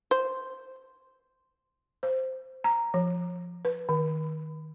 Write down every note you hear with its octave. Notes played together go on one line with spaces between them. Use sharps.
C5
C5
A#5
F3
B4
D#3